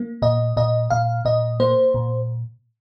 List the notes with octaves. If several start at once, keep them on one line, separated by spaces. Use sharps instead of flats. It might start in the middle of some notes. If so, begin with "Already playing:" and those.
Already playing: A#3
A#2 D#5
A#2 D#5
A#2 F5
A#2 D#5
A#3 C5
A#2